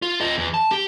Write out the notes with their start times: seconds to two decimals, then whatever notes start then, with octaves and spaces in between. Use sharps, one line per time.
0.02 F4
0.21 F4 D#5
0.38 E2
0.54 A5
0.72 G4